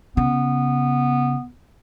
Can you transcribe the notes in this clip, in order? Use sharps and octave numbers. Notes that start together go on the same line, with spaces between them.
C#3 B3